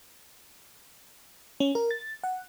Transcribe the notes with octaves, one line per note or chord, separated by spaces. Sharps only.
C#4
A#4
A6
F#5